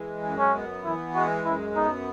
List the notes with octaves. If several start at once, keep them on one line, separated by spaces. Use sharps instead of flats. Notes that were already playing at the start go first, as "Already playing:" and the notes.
Already playing: E3 G#3
F#2
C#4
B3
E3 E4
G#3 F#4
F#2 E4
B3 D#4